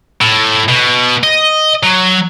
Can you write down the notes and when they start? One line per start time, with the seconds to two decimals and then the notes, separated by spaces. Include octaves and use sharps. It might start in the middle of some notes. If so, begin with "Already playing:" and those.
0.21 A2
0.69 B2
1.23 D#5
1.83 F#3